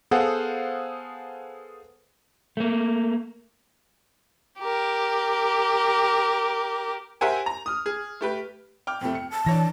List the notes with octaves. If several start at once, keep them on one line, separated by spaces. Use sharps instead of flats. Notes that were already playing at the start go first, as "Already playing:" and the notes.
B3 G#4 A4 C5 F5 F#5
A3 A#3
G4 A#4
G4 A#4 C5 E5 F#5 G#5
A#5
D#6 F6
G#4
A3 G4 B4
G5 D6 F6
F2 C3 A3 G5
C#7
A5
E3 D4 C#5 A#6